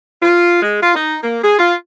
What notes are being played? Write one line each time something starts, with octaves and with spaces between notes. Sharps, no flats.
F4
G#3
F4
D#4
A#3
G#4
F4